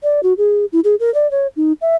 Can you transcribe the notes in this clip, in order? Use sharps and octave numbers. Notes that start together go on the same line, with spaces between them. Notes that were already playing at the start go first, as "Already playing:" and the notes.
D5
F#4
G#4
E4
G#4
A#4
D5
C#5
D#4
E5